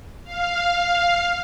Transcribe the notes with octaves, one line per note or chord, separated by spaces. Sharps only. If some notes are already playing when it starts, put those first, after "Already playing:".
F5